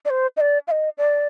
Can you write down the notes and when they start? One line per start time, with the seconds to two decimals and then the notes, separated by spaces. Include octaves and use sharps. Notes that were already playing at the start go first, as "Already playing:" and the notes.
0.05 D5
0.10 C5
0.37 D#5
0.41 D5
0.67 F5
0.71 D#5
0.98 D5